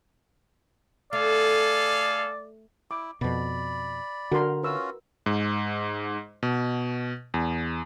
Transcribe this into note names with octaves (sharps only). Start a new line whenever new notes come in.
A3 G#4 A4 D5 F5
E4 D6
F2 B2 D5 B5
D3 F#4 A#4 C6
C#4 F4 F#4 B4 E6
G#2
B2
E2